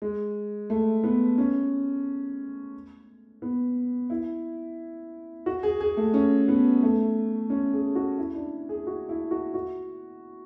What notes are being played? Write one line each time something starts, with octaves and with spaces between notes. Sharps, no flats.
G#3
A3
B3
C#4
B3
E4
F#4
G#4
G#4
A3
C#4
B3
A3
C#4
G#4
F#4
E4
D4
G#4
F#4
E4
F#4
F#4